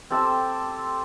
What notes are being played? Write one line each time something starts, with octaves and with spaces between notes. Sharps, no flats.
C4 G4 A4 G5